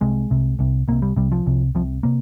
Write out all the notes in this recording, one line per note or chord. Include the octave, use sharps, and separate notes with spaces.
C2 C3 G#3
C2 C3
C2 C3
C2 C3 A#3
G3
C2 C3 G3
F3
C2 C3
C2 C3 F3
C3 A#3